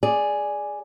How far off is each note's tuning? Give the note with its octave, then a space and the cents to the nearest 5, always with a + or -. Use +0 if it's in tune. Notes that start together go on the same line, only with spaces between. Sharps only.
G#4 +0 D5 +5